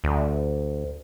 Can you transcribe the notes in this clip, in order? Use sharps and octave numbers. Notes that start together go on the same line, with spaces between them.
D2